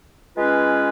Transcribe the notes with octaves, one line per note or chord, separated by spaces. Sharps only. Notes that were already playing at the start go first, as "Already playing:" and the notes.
G#3 C#4 F4 B4